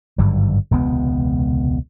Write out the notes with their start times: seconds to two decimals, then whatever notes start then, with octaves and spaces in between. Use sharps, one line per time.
0.18 G#1 G2 D3 F#3
0.71 E1 C#2 C3 B3